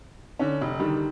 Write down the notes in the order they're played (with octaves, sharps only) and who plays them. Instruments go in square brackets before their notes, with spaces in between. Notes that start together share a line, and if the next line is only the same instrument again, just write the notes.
[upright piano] D3 C#4
F1
D3 D#3 G3